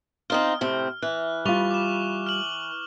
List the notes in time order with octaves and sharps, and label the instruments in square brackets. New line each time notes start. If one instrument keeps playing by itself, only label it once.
[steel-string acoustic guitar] C4 D#4 F4 [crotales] F6
[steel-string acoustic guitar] A2 C3 C4
[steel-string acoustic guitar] E3 [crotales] F#6
[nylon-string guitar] G3 F4 [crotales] C#6 F7 G7
[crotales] D6 E7
F6 F#7